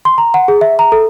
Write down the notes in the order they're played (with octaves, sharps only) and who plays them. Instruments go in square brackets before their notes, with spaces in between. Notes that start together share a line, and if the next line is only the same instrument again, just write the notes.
[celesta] C6
A#5
F#5
G#4
E5
A#5
A4